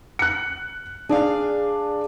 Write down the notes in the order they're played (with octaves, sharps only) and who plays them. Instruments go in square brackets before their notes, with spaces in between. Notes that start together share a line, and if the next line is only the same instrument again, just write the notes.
[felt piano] F#6 C#7
[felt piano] D4 D5 [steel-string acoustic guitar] G#4 F5